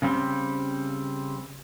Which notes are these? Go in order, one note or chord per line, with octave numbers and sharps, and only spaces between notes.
C#3 G3 C4